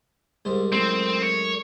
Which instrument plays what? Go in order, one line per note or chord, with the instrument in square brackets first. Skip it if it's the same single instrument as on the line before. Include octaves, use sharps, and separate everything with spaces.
[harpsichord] C2 G#2 C5
[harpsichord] F#2 A2 G#3 [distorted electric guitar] C4
[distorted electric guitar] C#5